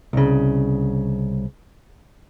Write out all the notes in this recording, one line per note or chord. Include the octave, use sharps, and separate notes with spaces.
C2 C#3